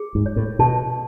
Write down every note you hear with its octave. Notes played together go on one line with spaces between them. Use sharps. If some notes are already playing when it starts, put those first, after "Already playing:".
Already playing: G#4
G#2
C#5
A2
B2 A5